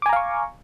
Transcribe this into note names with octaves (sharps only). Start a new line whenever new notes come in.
F5 G#5 A#5 C#6 D6